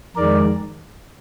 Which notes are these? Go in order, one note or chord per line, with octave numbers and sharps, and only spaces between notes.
F2 D#3 G#3 A#4 D5